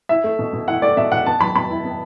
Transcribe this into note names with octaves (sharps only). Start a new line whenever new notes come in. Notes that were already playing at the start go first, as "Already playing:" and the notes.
E4 E5
A3
B2
B2
E4 F#5
A3 D5
B2 E5
B2 F#5
B3 A5
F#3 B5
B2 B5
E4
B3